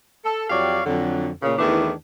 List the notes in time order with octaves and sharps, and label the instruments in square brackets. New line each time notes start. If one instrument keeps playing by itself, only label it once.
[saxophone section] A4
F2 F#3 G4 C#5 D5 F5
F2 D3 F#3
A#2 C#3
E2 D#3 E3 A3 B3 D4